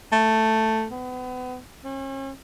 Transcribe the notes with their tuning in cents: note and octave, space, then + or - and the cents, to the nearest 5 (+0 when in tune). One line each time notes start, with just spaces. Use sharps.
A3 +5
B3 +35
C#4 -40